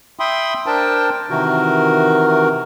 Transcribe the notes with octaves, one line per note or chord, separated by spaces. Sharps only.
E5 G5 B5 C6 D#6
D4 A#4 C5 G5 A5
C3 D#3 E3 F#4 A#4